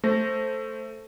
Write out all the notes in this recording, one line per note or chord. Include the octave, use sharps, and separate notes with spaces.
A3 C5 A#6